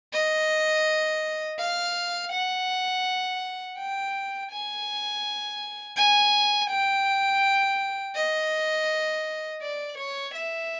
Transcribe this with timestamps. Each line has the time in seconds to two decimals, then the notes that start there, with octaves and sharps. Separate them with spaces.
0.13 D#5
1.59 F5
2.32 F#5
3.78 G5
4.52 G#5
5.97 G#5
6.70 G5
8.15 D#5
9.62 D5
9.98 C#5
10.35 E5